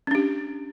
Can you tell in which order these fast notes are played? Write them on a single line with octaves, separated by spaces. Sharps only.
C#4 D4 G4